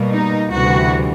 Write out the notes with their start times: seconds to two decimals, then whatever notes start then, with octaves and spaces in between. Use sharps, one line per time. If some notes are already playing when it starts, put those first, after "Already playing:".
Already playing: B2 G3 A#3
0.10 D#4
0.51 D2 C3 E3 G3 F#4